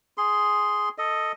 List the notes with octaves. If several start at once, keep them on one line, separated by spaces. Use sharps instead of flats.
G#4 C6
A4 D#5